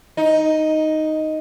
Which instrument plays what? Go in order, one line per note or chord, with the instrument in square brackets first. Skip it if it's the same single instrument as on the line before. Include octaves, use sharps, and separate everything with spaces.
[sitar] D#4